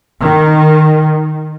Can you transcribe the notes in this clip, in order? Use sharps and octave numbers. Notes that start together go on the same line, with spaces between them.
D#3